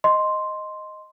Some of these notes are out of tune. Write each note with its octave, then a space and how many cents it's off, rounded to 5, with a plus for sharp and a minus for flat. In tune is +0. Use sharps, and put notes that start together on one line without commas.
D#5 +0 C6 +0